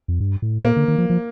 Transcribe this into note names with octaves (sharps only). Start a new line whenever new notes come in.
F2
G2
A2
A#2 A#3
D3
D#3
F3
F3